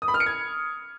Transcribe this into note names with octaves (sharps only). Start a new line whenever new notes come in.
D#6
B5
F6
C#7
G#6